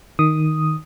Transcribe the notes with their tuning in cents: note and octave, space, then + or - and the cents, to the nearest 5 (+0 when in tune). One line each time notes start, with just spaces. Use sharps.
D#3 +0 D#6 +0